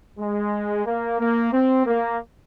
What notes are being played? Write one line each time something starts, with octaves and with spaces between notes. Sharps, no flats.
G#3
A#3
A#3
C4
A#3